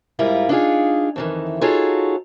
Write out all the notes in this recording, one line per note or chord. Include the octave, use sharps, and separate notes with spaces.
G#2 G3 E4 F4 A#4
D4 D#4 F4 G#4
F2 D#3 E3
D#4 F4 F#4 G#4 A4 C#5